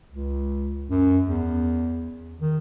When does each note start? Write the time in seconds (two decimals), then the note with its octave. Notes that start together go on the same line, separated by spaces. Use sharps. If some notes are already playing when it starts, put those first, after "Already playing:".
0.11 C#2
0.90 F#2
1.26 E2
2.41 D#3